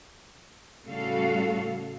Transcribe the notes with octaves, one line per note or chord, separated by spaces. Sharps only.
A2 C#3 G3 F#4 A4 F5